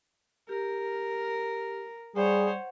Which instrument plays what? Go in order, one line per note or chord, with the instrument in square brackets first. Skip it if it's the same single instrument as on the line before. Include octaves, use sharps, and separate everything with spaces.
[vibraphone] G4 [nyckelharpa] A#4
[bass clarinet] G3 [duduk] G#4 [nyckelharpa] C5 C#5 [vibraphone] F#5